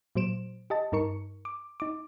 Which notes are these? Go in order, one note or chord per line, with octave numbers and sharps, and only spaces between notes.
A#2 F#3 C5 D7 E7
G4 D#5 A5
G2 D#4 A#4 C#6 C#7
D6
D#4 D6